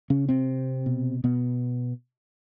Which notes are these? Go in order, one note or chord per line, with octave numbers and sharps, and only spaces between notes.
C#3 C#4
C3 C4
B2
B2 B3